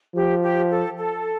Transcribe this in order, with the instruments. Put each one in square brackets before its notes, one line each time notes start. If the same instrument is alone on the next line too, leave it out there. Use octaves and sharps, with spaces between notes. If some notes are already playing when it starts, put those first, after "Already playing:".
[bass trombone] F3 [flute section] G4
[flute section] G4
A4
A4